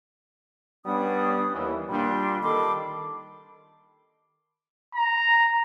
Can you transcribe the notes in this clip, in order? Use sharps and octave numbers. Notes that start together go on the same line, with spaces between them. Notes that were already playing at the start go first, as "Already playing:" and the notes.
G3 B3 C#4 D4 D#6
D#2 E3
A#2 G3 D4 C6
D#3 A4 B5 C6 D6
A#5